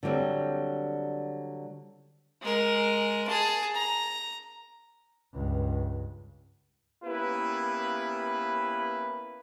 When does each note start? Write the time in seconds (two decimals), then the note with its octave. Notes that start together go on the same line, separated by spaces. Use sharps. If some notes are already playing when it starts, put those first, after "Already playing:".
0.03 D3 F#3 G3 C4
2.42 G#3 A#4
3.27 G#4 A5
3.74 A#5
5.33 C#2 G2
7.04 A#3 B3 C#4 E4 G4 B4